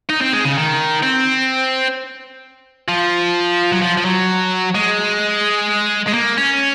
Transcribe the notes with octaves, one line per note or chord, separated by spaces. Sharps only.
D#4
C4
G#3
C#3
D#3
C4
F3
F#3
F3
F3
F#3
G#3
G#3
A#3
C#4